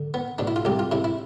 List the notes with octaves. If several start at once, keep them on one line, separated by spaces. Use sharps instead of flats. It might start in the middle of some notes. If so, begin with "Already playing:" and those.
Already playing: D3
B3
B2 D4
E4
F4
C2 G4
F4
C3 E4
E4